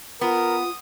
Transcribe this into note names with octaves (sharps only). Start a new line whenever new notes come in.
B3 F4 A#4 D#6